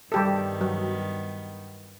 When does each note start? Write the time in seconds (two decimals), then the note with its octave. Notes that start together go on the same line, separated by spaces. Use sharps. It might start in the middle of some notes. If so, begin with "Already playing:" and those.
0.12 G2 D#3 G3 B3 G4 A4
0.61 F#3